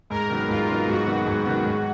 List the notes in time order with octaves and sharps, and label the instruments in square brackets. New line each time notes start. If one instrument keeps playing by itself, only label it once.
[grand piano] G#2 [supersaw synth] A#4
[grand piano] D#3 F#3 B3
[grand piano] G#2 [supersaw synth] F4
[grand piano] D#3 F#3 B3
[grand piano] G#2 [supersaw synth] F#4
[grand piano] D#3 F#3 B3
G#2
D#3 F#3 B3
G#2